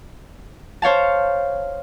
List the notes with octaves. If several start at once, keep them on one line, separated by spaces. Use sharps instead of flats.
C5 C#5 F5 A5